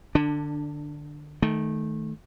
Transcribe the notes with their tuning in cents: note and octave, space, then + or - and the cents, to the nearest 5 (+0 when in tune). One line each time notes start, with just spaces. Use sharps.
D3 +20 D4 +0
D#3 +0 A3 -20